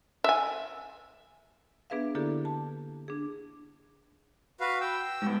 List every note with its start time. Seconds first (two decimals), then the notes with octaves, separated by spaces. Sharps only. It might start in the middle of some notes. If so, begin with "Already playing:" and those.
0.24 E5 G#5
1.90 B3 D4 G#4 B4 E5 F5
2.15 D3 A#3 D4 E4 G4 A4
2.45 A5
3.08 D4 G#4
4.60 F#4 B4 F5
4.80 G5 E6
5.22 G#2 B3